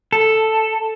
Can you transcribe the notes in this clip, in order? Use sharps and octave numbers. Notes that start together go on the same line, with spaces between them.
A4